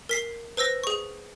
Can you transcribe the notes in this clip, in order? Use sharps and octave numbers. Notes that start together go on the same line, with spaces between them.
A#4 B6 C7
B4 C5 E6 A#6
G#4 C#6